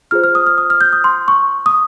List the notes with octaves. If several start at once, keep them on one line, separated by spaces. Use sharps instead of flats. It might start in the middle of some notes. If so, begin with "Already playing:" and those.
F4 G#4 C5 F6
F6
D#6
F6
D#6
F6
G6
D#6
C6
C#6
D#6